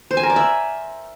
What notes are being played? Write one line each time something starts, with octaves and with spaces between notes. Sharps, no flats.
C5
G#5
A#4
D5
E5